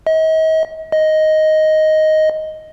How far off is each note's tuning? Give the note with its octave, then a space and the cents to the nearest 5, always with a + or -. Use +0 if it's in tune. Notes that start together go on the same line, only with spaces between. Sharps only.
D#5 +40
D#5 +5